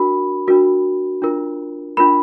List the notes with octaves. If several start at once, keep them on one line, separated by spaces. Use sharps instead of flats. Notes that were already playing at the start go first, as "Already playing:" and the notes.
Already playing: D4 F#4 A#4 B5
D4 F#4 A#4
D4 F4 A#4
D4 F4 A#4 B5